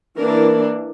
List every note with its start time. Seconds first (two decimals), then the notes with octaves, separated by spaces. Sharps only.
0.17 E3 A#3 D4 A#4